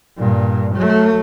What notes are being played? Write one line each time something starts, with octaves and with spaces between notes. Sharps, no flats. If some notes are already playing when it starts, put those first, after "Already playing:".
G2 A#2
F#3 A3